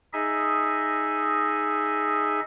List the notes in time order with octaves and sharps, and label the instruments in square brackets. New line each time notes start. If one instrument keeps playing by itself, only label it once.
[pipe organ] D#4 G#4 D#5 E5